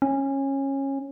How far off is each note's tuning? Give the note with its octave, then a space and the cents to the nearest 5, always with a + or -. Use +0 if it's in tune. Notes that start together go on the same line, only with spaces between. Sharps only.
C#4 -20